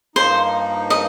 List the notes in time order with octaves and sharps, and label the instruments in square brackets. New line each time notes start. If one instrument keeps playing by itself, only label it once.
[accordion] G2 F3 A#3 D#4 [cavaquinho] C5
[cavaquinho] D#5